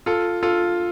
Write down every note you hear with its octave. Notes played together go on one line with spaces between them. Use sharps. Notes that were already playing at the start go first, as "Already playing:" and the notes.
F4 A4
F4 A4